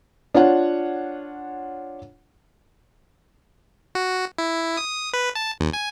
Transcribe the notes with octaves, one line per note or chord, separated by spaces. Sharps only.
D4 F4 C#5 F#5
F#4
E4
D#6
B4
A5
D#2
G#5